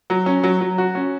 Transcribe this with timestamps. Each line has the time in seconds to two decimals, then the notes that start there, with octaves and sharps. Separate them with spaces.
0.10 F#3
0.26 C#4
0.43 F#3
0.61 F#3
0.78 F#4
0.95 C#4